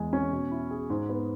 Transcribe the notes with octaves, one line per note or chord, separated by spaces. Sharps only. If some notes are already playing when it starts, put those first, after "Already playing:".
Already playing: E2 G#3
C#4
B2
E4
G#4
G#2
B3